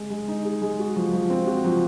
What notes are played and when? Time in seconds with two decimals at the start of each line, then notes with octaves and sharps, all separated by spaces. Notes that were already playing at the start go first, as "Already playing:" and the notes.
Already playing: G#3 G#4
0.10 G#3
0.28 D#4
0.45 G#4
0.62 G#3
0.79 F#4
0.96 F3
1.13 F3
1.30 C4
1.46 F#4
1.65 F3